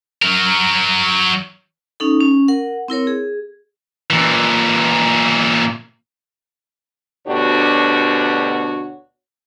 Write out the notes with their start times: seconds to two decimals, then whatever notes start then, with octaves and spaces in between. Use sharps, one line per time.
0.22 F#3 A#4
2.00 C#4 D#4 A4
2.21 C#4
2.48 A#4 F#5
2.88 C4 E4 A#4 C#5
3.07 G#4
4.10 A#2 E3
7.27 D2 B2 D4 F#4 G4 C#5